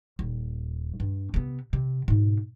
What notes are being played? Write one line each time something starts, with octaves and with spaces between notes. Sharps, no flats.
D#1
G2
C3 B3
C3
G#2 B2